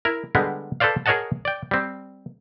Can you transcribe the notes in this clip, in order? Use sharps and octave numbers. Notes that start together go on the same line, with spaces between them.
E4 A#4
D3 G3 G#3 B3
A4 B4 C5 D5 F5
G#4 A#4 C#5 D#5 F#5 A5
D5 G5
G3 C4